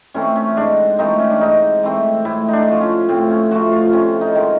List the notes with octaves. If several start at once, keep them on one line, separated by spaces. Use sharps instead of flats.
E3 A3 C4 C#4
C#4
G#2 D4
E3 A3 C4 D#4
C#4
D4
G#2 D#4
E3 A3 C4
A2 E4
D4 D#4
F3 A3
C#4
A2 C4
C#4
F3 A3 F#4
F4
C3 C#4
D#4
D#3 G#3